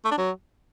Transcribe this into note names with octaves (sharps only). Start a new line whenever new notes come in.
A3
D4
F#3